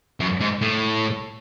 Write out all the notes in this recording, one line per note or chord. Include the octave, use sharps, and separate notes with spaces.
F#2
G#2
A2